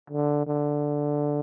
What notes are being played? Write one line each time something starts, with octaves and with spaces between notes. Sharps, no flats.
D3
D3